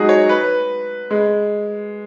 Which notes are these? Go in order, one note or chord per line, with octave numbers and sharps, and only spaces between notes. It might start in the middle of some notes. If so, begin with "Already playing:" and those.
Already playing: F#3 G#3 D#4 F#4 G#4
C#5
B4
G#3